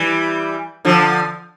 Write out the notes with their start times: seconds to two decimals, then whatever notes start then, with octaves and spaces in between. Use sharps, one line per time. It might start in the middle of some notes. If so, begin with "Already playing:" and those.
Already playing: E3 G3
0.85 D3 F3